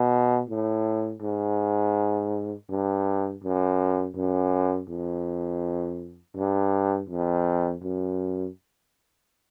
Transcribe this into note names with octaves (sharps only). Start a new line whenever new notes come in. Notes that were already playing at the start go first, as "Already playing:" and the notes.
Already playing: B2
A2
G#2
G2
F#2
F#2
F2
G2
F2
F#2